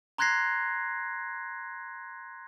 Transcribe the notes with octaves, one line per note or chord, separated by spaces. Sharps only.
A#5 C6 F#6 G#6 A#6 C7